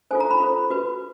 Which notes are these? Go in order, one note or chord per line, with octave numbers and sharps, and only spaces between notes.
F4 A4 C5 G#5
A#5
B5
F4 A4 C5
F#4 B4